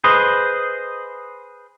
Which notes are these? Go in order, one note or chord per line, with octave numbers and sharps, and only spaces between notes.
G#4 B4 C5 D#5